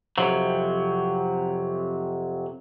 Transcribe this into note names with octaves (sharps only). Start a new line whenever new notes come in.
F2 C3 F#3